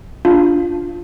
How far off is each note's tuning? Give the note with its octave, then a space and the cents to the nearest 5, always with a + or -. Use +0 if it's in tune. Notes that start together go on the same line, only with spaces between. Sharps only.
D4 +0 F4 +0 F5 +0